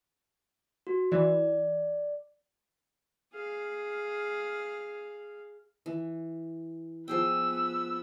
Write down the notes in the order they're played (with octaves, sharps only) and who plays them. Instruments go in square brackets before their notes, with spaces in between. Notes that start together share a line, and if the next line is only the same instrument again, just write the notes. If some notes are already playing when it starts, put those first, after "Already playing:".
[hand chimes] F#4
[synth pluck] E3 [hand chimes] D5
[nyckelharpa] G#4 F5
[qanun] E3
[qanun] F3 G#4 G5 [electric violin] B3 E6